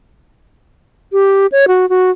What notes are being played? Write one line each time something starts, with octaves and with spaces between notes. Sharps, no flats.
G4
C#5
F#4
F#4